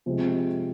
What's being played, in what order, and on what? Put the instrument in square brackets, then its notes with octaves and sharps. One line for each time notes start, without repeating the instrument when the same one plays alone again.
[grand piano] C3 F3 G#3 C4